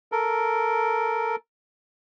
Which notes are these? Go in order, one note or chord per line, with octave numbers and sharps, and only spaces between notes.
A4 A#4